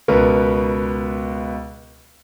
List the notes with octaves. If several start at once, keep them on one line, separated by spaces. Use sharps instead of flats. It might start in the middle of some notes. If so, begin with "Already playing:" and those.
C#2 B2 B3 A#4 B4